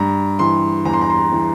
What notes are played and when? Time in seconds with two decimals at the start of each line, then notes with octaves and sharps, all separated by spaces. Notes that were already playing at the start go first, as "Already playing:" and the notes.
Already playing: G2 A#5
0.39 E3 C6
0.85 E2 A#5
0.93 C6
1.01 A#5
1.10 C6
1.16 A#5
1.32 E3